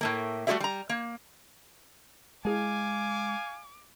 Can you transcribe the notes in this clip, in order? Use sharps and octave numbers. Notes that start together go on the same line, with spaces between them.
A2 A3 A#3
G3 A3 F#4 G#4 D5 E5
G3 A#5
A#3
G#3 E4 G#4 F5 G#5 A5 D6